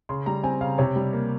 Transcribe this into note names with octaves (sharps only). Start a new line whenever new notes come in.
C#3 C6
G3 A#5
C4 G#5
C#3 F5
C3 C#5
G3
A#3